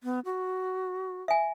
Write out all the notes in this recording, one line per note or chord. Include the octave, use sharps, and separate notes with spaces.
B3
F#4
E5 G#5